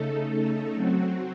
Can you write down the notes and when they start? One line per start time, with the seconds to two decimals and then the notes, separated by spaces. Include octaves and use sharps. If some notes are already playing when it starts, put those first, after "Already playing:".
Already playing: C#3 A3 D#4 A4
0.74 F#3 C4 F#4